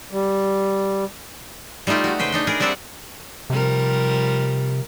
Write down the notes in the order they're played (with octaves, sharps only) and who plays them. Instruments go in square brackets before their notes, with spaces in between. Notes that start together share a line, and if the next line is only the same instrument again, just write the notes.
[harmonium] G3
[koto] G3 A3 D#4 F4 G4
F#4 B4
C#3 B4 C5 G5
D4 D#4 B4
G#4 A#4 B4 D5
G3 C4 A4 D5 E5 F#5
[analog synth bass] C3 [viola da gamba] F3 G3 A#4